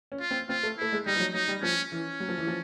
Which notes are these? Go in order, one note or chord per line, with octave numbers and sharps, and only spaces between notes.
C#4
F4
C4
C4 F4
A3
A3 E4
G#3
G3 D#4
F3
F#3
F#3 D#4
G3
F3 C#4
E3 C#4
F#3
F3
E3
F3